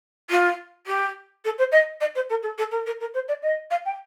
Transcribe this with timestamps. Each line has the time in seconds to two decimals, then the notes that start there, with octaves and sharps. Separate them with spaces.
0.30 F4
0.86 G4
1.44 A4
1.58 C5
1.71 D#5
2.00 D#5
2.15 C5
2.29 A#4
2.42 A4
2.58 A4
2.71 A#4
2.86 A#4
3.00 A#4
3.14 C5
3.28 D5
3.42 D#5
3.70 F5
3.85 G5